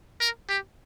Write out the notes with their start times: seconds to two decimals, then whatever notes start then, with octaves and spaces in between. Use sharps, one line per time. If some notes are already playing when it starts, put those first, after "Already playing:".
0.20 A#4
0.49 G4